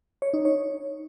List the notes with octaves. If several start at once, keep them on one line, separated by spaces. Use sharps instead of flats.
C#5
D#4
C#5